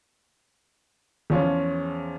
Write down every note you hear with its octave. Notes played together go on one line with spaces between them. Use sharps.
E2 F3 C#4 F4